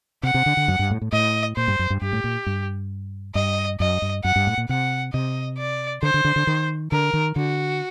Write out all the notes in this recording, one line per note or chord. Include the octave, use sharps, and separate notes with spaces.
C3 F#5
C3
D3
D3
F#2
G2
A2
A2
A2 D#5
A#2 C5
G2
F#2
G2
G2 G4
A2
A#2
G2
G2 D#5
F#2 D#5
G2
F#2 F#5
G2
A2
A#2
C3 F#5
C3 D#5
D5
D3 C5
D3
D3
D3
D#3
D3 A#4
D#3
D3 F#4